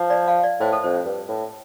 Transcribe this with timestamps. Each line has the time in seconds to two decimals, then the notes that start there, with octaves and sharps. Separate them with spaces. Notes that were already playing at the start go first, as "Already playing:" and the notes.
Already playing: F3
0.10 D5
0.28 F5
0.44 D5
0.61 A2 C5
0.73 A4
0.84 F2 C5
1.05 G2
1.29 A2